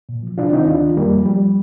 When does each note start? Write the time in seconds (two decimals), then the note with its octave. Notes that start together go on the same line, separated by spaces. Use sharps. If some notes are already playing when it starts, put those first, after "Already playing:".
0.09 A#2
0.23 F3
0.38 C3 D4 F4
0.52 D#3 C4 D#4
0.67 D2 D4 F4
0.82 D#3
0.97 F2 G3 A#3
1.11 F3
1.26 F3 G3